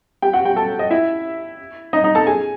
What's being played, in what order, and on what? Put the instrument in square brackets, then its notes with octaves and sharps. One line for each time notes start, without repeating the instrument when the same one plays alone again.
[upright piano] G4 G5
F#4 F#5
G4 G5
A4 A5
D#5
E4 E5
D#4 D#5
D#4 D#5
A4 A5
G#4 G#5